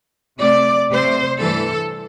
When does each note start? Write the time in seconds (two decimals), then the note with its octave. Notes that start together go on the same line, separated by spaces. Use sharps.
0.38 C3 A3 C4 D5
0.90 C3 A3 C4 C5
1.40 G2 E3 A3 A4